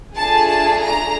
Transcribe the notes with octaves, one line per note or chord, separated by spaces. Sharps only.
A3 D4 F4 G#4 A5
A5
A#5